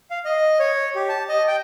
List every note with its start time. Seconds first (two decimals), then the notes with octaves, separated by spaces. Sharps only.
0.11 F5
0.25 D#5
0.59 C#5
0.95 G4
1.09 A5
1.29 D#5
1.48 G5